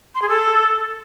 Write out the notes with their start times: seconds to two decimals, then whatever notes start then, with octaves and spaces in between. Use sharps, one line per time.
0.15 C6
0.22 G#4
0.29 A4